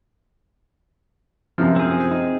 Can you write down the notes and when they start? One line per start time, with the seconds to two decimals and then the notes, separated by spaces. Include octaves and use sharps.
1.58 F#2 C3 F3
1.76 C4 G#4
2.11 D#4